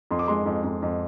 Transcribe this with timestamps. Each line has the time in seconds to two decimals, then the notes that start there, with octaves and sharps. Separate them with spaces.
0.11 F2 C6
0.19 D6
0.28 G#3 C6
0.46 F2
0.64 F2
0.82 F2